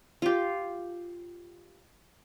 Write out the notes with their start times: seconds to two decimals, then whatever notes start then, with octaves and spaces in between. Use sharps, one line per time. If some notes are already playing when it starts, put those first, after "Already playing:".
0.22 F4 G4